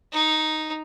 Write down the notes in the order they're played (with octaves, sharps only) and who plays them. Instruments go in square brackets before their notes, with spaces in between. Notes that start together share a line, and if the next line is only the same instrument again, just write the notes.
[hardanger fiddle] D#4